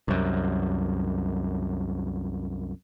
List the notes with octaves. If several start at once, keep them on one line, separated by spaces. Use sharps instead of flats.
C2 F#2